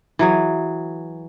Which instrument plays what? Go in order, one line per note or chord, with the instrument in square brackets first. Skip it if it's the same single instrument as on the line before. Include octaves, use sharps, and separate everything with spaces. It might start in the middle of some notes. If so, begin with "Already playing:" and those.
[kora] E3 F#3 G#4